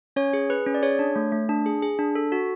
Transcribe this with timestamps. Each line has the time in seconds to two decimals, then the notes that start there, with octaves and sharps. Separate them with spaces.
0.16 C#4 C#5
0.33 G#4
0.50 G#4 B4
0.66 C#4
0.74 D5
0.83 G#4 C#5
0.99 D4
1.16 A3
1.32 A3
1.49 D4
1.66 G#4
1.82 G#4
1.99 D4
2.15 A4
2.32 F#4